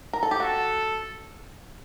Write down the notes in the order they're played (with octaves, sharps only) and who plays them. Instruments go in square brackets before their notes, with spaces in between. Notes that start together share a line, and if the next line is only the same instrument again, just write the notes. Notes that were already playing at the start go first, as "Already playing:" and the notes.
[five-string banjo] A#4
A4
G4
[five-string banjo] F#4 [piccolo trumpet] A4